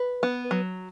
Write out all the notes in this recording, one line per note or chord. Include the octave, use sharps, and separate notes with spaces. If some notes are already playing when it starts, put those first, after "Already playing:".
Already playing: B4
B3
F#3